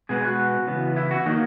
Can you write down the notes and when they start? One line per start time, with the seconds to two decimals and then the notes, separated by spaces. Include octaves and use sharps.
0.09 B2 G#3 B3 G#4
0.25 F#4
0.67 C#3 E3 B3
0.96 E4
1.11 F#4
1.26 D#3 F#3 A#3 D#4